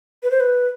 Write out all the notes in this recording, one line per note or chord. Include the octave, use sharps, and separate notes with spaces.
B4
C5
B4